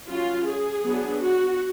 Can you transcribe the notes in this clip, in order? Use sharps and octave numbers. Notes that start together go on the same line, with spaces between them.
F#3 C#4 F4
G#4
F#3 B3 D4
F#4